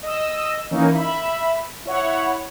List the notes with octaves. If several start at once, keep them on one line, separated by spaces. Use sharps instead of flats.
D#5 E6
E3 A#3 C#4 D#4
E5 B5
E4 C#5 F#5